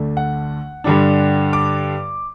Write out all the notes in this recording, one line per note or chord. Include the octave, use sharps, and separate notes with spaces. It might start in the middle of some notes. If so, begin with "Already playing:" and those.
Already playing: D2 D3 A3 D4
F#5
G2 D3 G3 D4
D6